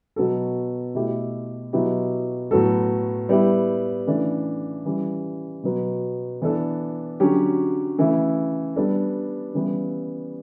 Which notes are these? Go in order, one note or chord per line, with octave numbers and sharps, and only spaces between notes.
B2 F#3 B3 F#4 A4
B2 A3 E4 G4
B2 F#3 B3 E4 G4
A2 F#3 B3 F#4 A4
G3 B3 E4 G4
C#3 E3 A3 D4
C#3 E3 G3
B2 F#3 B3
E3 B3 D4 A4
D3 F#3 C#4 G4
C#3 E3 A3 E4
G3 B3 D4 A4
C#3 E3 G3 B3 E4